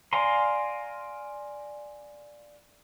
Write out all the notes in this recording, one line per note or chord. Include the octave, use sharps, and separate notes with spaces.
D5 F5 G#5 A#5 C6